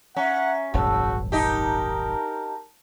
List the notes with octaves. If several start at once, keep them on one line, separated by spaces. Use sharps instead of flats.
C#4 E5 F#5 A#5
D#1 G#1 F#2 C#3 F#4 A5 E6
D#4 G4 A#4 A5